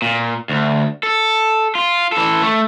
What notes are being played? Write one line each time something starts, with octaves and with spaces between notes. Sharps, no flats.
A#2
D2
A4
F4
E3 A4
A3